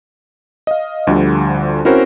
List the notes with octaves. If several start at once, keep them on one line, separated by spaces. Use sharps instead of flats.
D#5 F5
D2 D3 F3 G3
C4 C#4 E4 F#4 A#4 C5